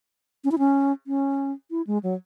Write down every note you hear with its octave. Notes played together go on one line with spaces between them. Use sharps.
C#4
E4
C#4
C#4
E4
G#3
F#3